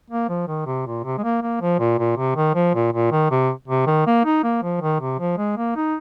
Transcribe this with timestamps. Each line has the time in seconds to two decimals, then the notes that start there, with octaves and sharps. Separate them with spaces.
0.10 A#3
0.29 F3
0.48 D#3
0.66 C3
0.86 A#2
1.04 C3
1.18 G#3
1.23 A#3
1.42 A#3
1.61 F3
1.79 A#2
1.99 A#2
2.17 C3
2.36 D#3
2.55 F3
2.74 A#2
2.93 A#2
3.11 D#3
3.31 C3
3.68 C3
3.87 D#3
4.06 A#3
4.25 D#4
4.44 A#3
4.63 F3
4.81 D#3
5.00 C3
5.19 F3
5.37 G#3
5.57 A#3
5.76 D#4